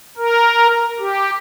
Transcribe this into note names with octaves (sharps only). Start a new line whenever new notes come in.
A#4
G4